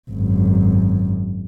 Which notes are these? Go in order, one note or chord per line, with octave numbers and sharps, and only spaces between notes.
G#1 F#2